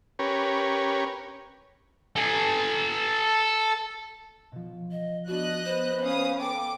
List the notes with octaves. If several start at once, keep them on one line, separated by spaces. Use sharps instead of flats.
C#4 G4 A#4 B4 C#5
A4 G#5
B2 F3
D#5
B3 D4 F#4 D#5 F#6
B3 B4 C5
C#4 F5 D#6
A4 G5 D6